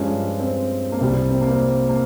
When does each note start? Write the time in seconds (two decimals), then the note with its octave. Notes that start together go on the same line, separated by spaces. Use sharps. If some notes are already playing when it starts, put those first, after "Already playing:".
Already playing: G2 F3 G#3 C#4
0.40 C4
0.92 A#3
1.00 C2 C3 G3 C4
1.29 C4
1.41 A#3
1.51 C4
1.89 A#3